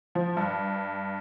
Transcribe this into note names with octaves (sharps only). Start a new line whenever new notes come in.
F3
G2